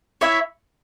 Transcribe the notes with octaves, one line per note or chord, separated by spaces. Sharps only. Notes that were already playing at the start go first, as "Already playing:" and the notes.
E4 C#5 E5